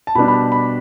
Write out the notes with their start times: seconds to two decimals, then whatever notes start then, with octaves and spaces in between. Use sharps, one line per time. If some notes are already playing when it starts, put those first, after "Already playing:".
0.07 A5
0.15 B2 G3 B3 D4 B5
0.28 B5
0.34 A5
0.52 B5